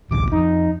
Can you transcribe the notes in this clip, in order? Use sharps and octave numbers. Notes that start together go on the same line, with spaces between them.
A1 D2 B2 D6
F2 D#4